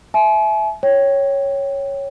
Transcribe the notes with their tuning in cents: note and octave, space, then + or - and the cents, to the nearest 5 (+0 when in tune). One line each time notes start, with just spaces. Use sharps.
E5 +5 G#5 +45
C#5 +0 G5 +0